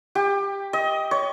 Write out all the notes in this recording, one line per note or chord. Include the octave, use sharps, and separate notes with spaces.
G4
D#5
C#5